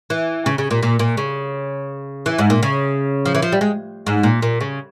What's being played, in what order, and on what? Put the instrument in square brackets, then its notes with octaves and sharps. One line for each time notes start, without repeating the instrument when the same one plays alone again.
[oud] E3
C#3
C#3
A#2
A#2
A#2
C#3
E3
G#2
A#2
C#3
F3
E3
F3
G3
G#3
G#2
A#2
A#2
C#3